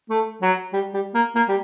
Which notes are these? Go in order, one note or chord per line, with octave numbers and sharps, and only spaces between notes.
A3
F#3
G3
G3
A#3
A#3
G3